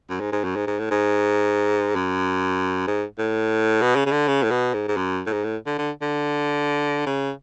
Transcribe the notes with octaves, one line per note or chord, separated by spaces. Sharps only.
F#2
G#2
G#2
F#2
G#2
G#2
A2
G#2
F#2
G#2
A2
B2
C#3
C#3
D3
C#3
A2
B2
G#2
G#2
F#2
A2
G#2
A2
D3
D3
D3
C#3